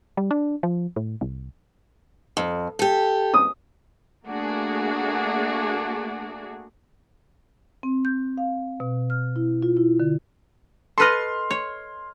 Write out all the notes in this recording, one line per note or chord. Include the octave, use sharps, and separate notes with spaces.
G3
D4
F3
A2
C2
F2
G4 A4
D#6
A3 A#3 D4 F#4 G#4
C4
G6
F5
B2
F6
E4
F4
E4
D3
A4 B4 D#5 C6 F6
C#5